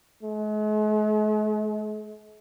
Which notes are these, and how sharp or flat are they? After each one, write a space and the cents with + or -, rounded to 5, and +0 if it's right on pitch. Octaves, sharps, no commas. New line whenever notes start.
G#3 +45